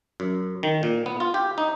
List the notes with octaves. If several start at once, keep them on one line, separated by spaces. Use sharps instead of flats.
F#2
D#3
A#2
B3
F4
G4
D#4